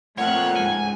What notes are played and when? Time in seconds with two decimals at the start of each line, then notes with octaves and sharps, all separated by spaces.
0.18 F2 A#2 A3 C#5 F#5 F#6
0.56 C#2 G#2 G#5